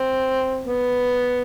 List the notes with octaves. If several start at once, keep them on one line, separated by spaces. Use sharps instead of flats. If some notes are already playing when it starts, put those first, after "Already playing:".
Already playing: C4
B3